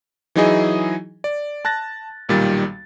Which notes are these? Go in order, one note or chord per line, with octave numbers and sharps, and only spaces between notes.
E3 F#3 D#4 E4 G#4 D#5
D5
A5 F#6 A6 A#6
B1 A#2 D#3 G3 A6